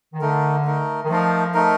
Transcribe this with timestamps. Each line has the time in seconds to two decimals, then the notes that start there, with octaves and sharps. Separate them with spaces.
0.13 D#3
0.20 D3 A3 D#4 A#4
0.65 A3 D#4 A#4
1.04 D#3
1.09 F3 A3 D#4 A#4
1.54 A3 D#4 A#4